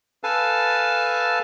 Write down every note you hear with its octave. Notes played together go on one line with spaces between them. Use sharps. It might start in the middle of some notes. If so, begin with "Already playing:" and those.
A4 B4 F5 G#5 A5